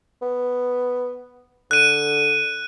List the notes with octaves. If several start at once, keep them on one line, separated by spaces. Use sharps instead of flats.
B3
D3 F#6 D#7